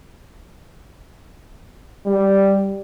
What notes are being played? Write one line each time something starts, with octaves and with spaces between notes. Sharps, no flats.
G3